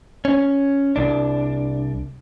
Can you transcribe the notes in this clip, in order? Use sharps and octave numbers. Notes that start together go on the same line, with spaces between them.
C#4
C2 D4